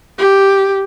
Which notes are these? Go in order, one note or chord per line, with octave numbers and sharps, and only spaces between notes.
G4